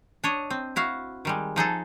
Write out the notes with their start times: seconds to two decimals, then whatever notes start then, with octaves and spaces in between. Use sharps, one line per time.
0.24 D4 C#5 D#5
0.50 C4
0.76 E4 F#4 F5
1.25 D#3 G3 G#3
1.56 F3 D#4 G#4 A4